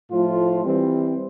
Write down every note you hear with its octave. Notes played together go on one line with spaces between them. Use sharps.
A2 F3 A3 F4
E3 G3 C4